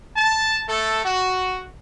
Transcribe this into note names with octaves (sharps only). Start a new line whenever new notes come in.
A5
A3 A4
F#4